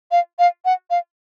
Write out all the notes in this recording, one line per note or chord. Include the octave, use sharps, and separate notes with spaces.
F5
F5
F#5
F5